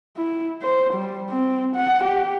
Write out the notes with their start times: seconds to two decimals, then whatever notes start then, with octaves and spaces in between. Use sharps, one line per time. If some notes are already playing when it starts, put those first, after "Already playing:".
0.16 E4
0.62 C5
0.93 G3
1.30 C4
1.76 F#5
2.04 G4